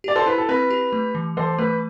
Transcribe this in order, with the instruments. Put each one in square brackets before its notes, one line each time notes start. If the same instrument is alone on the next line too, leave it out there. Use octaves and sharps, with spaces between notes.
[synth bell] G4 [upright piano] D5
[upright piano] A4 C5
[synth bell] E4 [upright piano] B4
[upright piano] A4
[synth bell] C4 [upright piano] B4
[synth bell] G4
A3
E3
[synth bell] E3 [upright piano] A4 C5
[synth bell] A3 [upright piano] B4